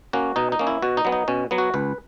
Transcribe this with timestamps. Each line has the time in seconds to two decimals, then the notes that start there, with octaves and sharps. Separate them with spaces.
0.13 A#3 C#4 F#4
0.36 B2 D#4
0.52 D#4
0.59 A#3 C#4
0.67 E4
0.82 B2 F#4
0.97 D#4
1.05 F#3 B3
1.12 D#4
1.28 B2 C#4
1.51 F#3 B3
1.58 F#4
1.74 C#2 B4